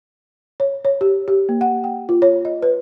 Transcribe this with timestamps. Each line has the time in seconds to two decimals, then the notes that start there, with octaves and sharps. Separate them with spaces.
0.60 C#5
0.85 C#5
1.01 G4
1.28 G4
1.49 A#3
1.61 F#5
1.84 G5
2.09 F4
2.22 C#5
2.45 D#5
2.62 B4